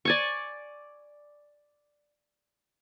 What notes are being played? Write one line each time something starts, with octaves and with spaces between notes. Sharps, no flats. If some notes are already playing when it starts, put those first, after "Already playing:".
D5 G#5 C#6